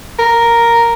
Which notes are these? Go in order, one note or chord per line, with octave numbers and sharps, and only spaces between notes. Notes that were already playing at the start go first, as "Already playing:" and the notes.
A#4